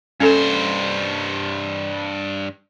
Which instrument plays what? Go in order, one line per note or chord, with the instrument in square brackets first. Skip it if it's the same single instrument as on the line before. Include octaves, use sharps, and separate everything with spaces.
[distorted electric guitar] G2 C5 [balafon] C#4 A4